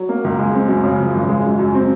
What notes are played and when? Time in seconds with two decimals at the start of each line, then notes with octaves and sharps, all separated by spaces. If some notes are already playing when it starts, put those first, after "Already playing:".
Already playing: F#3
0.09 A#3
0.24 C#2
0.39 G#3
0.54 C4
0.68 F#2
0.84 C#3
0.99 F3
1.14 G#1
1.29 G#3
1.44 F#2
1.59 F#2
1.74 C4